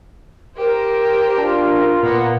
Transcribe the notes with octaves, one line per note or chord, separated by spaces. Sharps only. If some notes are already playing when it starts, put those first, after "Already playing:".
G4 A#4 C5
D4 F4
A#2 A#3 B3 F#5